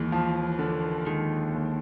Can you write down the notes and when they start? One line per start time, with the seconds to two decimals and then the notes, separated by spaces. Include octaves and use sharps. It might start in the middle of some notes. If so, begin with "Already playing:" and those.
Already playing: D#2 E3 G#3
0.12 F3
0.59 D3
1.06 D#3 G#3
1.54 D#2